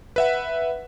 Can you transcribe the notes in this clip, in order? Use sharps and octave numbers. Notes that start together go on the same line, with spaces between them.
B4 E5 F#5